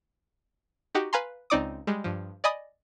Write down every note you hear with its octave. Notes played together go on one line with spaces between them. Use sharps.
D#4 F#4 G4
B4 F5 G#5 A#5 C6
C#2 C4 D#4 D5 D6 D#6
G3 G#3
G2 F3
D5 D#5 G#5 B5 D#6